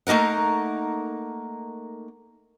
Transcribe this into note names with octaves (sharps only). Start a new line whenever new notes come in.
A3 A#3 D#4 A#4 F#5